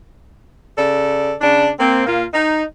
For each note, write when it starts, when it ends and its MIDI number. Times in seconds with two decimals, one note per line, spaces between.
0.77 1.34 49
0.77 1.34 69
0.77 1.34 74
1.41 1.70 49
1.41 1.70 62
1.80 2.05 58
1.80 2.05 60
2.07 2.24 46
2.07 2.24 58
2.07 2.24 65
2.33 2.63 63